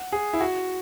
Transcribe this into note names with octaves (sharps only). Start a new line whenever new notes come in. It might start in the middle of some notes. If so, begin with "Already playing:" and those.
Already playing: F#5
G#4
E4
F#4